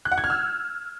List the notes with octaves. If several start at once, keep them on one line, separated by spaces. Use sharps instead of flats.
F#6
F#5
G#6
F6
E6